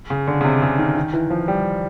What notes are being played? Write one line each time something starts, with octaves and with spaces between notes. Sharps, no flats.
C#3
D3
C#3
C3
C#3
D#3
D#3
E3
F3
G3